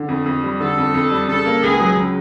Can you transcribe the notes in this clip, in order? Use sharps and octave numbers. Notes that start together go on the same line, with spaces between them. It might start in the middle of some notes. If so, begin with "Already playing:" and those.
Already playing: D3
F2
F2
G3
D3 A4
F2
F2
G3
C#3 A4
A#3
C#2 G#4
F#3
C#3